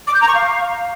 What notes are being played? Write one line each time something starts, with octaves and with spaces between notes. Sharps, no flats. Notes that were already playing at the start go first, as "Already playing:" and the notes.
D6
G6
A#5
C#6
F5